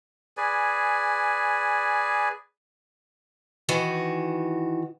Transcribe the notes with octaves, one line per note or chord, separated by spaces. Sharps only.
G#4 B4 D5 G#5
D#3 E3 F#4